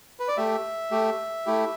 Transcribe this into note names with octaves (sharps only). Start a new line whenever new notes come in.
B4
D5
A3 G4 E5
A3 G4
A3 E4 G4